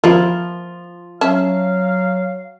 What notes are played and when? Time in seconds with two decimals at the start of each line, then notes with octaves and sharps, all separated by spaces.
0.04 F3 A#3 E4 F4
1.21 F#3 C#4 E5 F5 A5